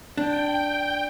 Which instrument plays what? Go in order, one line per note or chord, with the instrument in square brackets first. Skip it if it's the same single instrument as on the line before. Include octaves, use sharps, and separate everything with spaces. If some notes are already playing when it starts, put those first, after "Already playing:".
[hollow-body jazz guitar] D4 [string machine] G5